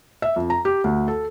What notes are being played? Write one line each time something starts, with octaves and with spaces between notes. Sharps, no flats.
E5
F2
A#5
G4
D2
A4